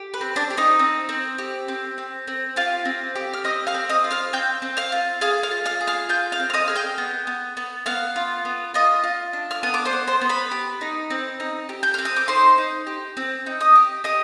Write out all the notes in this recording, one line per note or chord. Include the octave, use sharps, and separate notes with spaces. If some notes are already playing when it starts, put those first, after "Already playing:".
Already playing: G4
B4
C4
D4 D5
G4
D#4 D#5
C4
C4
G4
C4
C4
C4
F4 G4 F5
C4
G4
F6
C4 D#5 D#6
F5 F6
C4
D#5 D#6
F4
F5 F6
C4 G5 G6
C4
F5 F6
F4
G#4 F5 F6
F5 F6
F4
F5 F6
G#4
F5 F6
F4 G5 G6
F5 F6
C4
F6
D#5 D#6
G#4 F6
G5 G6
B3
B3
B3
B3 F5 F6
F4
B3
F4 D#5 D#6
F4
D4
F6
B3 D#6
D6
C5 C6
B3
C5 C6
B3
B4 B5
G4
D#4
C4
D#4
G4
G6
C4 F6
D#6
D6
D#4 C5 C6
D#4
G4
C4
D#4
D#5 D#6
G4
G4 D#5 D#6